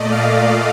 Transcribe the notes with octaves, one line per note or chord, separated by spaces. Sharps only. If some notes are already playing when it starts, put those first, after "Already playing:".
Already playing: A#2 A3 D5 D#5
F5